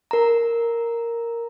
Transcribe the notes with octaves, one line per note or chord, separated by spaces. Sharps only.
A#4 A#5